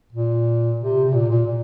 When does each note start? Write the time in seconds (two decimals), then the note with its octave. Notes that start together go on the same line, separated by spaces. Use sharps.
0.13 A#2
0.80 C3
1.04 C3
1.13 A#2
1.30 A#2
1.47 A#2